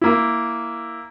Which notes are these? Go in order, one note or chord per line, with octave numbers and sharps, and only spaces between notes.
A#3 E4